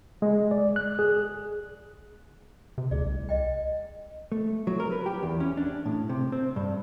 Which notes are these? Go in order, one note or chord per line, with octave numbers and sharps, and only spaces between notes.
G#3
D5
F#6
G#4
C3
D2 G#4 D5
C2
D#5 G5
A3
F#3
A#4
B4
G4
E2
C#4
D4
A2
C3
C4
G2